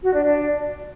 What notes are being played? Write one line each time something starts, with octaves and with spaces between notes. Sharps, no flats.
F#4
D4
D4